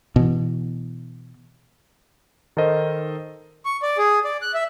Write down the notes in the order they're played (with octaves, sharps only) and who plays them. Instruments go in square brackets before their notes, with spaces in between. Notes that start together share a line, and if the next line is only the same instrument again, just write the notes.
[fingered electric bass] B2 E3
[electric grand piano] D#3 D#4 A4 A#4 C5 D#5
[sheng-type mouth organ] C#6
D5
G#4
D5
F#6
E5